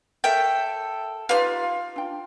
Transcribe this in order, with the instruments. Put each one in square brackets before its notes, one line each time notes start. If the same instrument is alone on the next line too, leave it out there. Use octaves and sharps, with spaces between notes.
[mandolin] A4 G5 [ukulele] A#4 C#5 E5
[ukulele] D#4 G4 B4 [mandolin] F4 F6
[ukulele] D4 G5